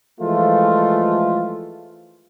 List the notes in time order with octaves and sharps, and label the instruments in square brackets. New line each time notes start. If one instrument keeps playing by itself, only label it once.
[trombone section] E3 F3 G#3 A3 F4